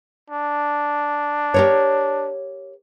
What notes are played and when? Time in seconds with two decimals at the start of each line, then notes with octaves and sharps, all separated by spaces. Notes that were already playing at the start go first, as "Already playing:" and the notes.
0.30 D4
1.54 G4 A#4 C#5